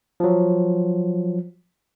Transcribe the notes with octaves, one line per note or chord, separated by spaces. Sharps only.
F3 F#3